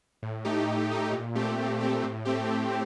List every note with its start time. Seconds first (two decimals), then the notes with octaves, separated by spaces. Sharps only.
0.23 A2
0.45 A3 D#4 G4
0.68 A2
0.90 A3 D#4 G4
1.12 A#2
1.35 A3 C4 G4
1.58 A#2
1.80 A3 C4 G4
2.03 A2
2.25 A3 C4 G4
2.49 A2